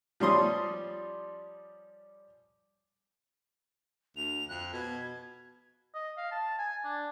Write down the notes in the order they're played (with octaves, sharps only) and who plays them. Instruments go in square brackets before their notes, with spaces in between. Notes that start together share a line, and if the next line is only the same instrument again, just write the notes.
[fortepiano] F3 G3 C#4 C6 D#6
[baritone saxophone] D2 [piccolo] F7
[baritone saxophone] F2 [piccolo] F#6
[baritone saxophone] B2 [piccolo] G#6
[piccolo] G#6
[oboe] D#5
F5
A5
G#5
D4